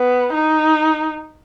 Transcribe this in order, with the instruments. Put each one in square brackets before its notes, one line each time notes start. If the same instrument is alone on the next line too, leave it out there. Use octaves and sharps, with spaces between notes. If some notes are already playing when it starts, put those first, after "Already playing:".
Already playing: [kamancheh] B3
D#4